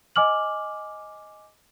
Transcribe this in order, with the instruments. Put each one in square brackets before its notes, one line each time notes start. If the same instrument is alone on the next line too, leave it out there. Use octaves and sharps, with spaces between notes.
[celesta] D#5 G#5 D6 F6 F#7